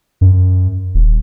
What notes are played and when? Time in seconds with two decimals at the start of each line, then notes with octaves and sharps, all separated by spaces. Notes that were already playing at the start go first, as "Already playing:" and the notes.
0.21 F#2
0.94 D#1